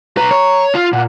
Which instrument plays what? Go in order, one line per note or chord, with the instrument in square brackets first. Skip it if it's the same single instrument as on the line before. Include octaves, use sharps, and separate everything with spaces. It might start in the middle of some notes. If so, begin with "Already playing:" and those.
[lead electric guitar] B1 B4 [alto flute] A#5
[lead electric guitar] C#5
F4
[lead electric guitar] A#2 [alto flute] F#5